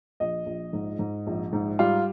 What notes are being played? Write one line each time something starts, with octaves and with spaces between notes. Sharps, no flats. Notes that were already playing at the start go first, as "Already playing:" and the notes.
A#1 D#5
A#1
G#2
G#2
A#1
G#2
G3 F4